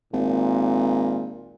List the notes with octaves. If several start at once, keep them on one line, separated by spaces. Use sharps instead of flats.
G#1 A#2